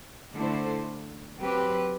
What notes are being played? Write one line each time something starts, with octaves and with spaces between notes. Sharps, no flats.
D3 A3 E4 A4 C5
F#3 C4 G4 B4